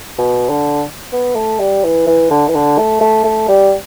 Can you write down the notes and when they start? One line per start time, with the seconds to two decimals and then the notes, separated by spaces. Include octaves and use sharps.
0.19 B2
0.50 D3
1.13 B3
1.36 A3
1.60 G3
1.84 E3
2.07 E3
2.31 D3
2.48 E3
2.55 D3
2.78 A3
3.01 A3
3.25 A3
3.49 G3